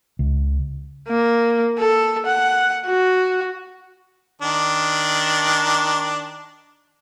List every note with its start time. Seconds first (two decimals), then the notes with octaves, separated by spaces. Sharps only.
0.19 C#2
1.08 A#3
1.79 A4
2.26 F#5
2.85 F#4
4.42 D#3 D4